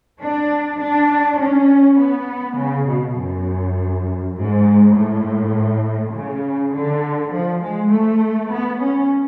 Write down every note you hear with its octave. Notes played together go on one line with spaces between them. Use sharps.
D4
D4
C#4
B3
C#3
B2
F#2
G#2
A2
C#3
D3
F3
G#3
A3
B3
C#4